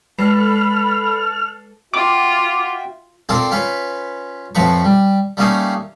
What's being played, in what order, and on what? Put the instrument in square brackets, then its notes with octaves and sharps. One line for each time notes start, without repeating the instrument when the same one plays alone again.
[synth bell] G#3 B4 C7 [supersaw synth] A4 [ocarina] B5 [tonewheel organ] F6
[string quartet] F4 [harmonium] F#4 E5 G5 [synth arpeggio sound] D6
[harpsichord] C4 D4 F4 A4 A#4
C#4 F4 B4
F2 A2 F3 B4 A#5 C#6
G3
G3 A3 A#3 C#4 D#4 F5